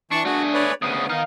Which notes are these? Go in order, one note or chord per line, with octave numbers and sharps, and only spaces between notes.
E3 D4 A5 C#6
A3 D4 F#4 G#4
B4 C#5 D5
D2 C#3 B3 D#6
D#3 D#4 F5